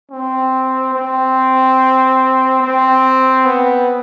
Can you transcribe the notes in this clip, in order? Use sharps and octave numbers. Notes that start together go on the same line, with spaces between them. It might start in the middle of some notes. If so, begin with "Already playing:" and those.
C4
C4
C4
B3